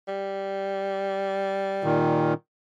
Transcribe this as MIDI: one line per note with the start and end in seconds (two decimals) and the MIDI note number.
0.08 2.31 55
1.84 2.34 46
1.84 2.34 51